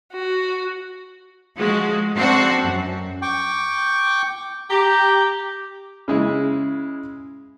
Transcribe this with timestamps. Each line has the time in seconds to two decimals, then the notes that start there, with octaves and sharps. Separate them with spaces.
0.13 F#4
1.56 F3 G#3 F#4
2.16 C4 D4 F#4 A4
2.63 F#2
3.22 G5 C#6 D6
4.70 G4 A#5
6.08 C#3 G#3 E4